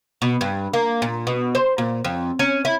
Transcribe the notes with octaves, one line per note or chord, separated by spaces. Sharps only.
B2
G2
A#3
A#2
B2
C5
A#2
F2
C#4
E4